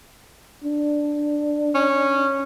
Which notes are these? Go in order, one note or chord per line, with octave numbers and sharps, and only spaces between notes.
D4
C#4